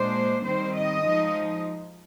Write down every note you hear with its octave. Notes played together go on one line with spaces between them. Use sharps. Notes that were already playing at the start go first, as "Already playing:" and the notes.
Already playing: A#2 G#3 D4 C5
D#3 G3 C4 C5
D#5
F3 G#3 D#4